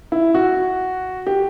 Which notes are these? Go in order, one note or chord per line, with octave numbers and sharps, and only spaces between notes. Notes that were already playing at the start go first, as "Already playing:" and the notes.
E4
F#4
G4